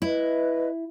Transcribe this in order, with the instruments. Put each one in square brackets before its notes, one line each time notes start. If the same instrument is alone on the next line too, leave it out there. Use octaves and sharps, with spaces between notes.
[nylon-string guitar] E4 [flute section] B4 D#5